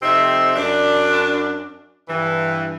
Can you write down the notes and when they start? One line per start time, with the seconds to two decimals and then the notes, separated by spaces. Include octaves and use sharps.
0.02 F2 C3 C4 D#4 E5
0.56 F#2 D4
2.08 G2 E3